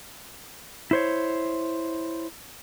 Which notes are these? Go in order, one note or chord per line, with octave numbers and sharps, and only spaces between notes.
E4 C5 C#5